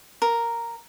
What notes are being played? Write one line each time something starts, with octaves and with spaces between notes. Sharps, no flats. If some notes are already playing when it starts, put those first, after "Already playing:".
A#4